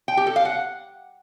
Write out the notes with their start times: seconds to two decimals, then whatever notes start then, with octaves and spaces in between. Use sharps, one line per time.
0.08 G5
0.17 G4
0.27 A4
0.36 F5
0.45 F#5